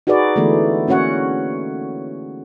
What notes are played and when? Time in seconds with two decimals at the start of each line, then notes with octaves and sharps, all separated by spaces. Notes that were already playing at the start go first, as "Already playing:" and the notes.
0.07 D#4 F#4 G#4 B4 D5
0.36 D3 E3 G#3 A3 B3
0.88 A#3 C#4 F#4 C#5 F#5